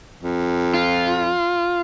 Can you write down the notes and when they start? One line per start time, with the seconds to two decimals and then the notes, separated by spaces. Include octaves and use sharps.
0.20 F2
0.74 F4